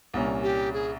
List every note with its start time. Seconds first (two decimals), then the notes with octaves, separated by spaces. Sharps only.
0.14 C2 A#2 G3 A#3 C#4
0.43 G4
0.73 G#4